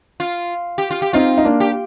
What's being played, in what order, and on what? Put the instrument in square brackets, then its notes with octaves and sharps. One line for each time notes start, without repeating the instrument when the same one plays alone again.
[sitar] F4
G4
F4
G4
[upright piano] C4 D#4 [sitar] F4
[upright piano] D#4
A#3 D4
[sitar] G4